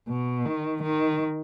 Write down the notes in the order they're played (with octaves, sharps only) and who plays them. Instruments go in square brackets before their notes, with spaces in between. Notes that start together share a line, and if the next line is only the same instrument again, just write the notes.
[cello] B2
D#3
D#3